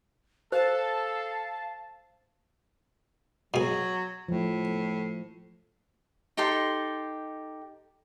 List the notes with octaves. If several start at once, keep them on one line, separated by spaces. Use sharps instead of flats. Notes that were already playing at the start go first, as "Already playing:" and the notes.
A4 C5 F5 A5
B2 F#3 G#4
A2 F3 A3
D#4 G4 A4 C6